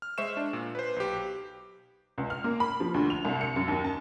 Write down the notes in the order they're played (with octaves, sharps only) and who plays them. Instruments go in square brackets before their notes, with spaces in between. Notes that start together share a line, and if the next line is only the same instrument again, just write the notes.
[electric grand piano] F6
G#3 C5 E5 C#6 E7
D4
A#2
B4 C5
B1 G4
[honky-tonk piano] C#2
F6
A#3
B5
F3
D2
F7
C2
C#7
F#2
D#2
A5